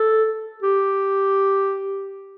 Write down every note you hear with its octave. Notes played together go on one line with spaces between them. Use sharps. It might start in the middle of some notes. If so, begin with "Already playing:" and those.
Already playing: A4
G4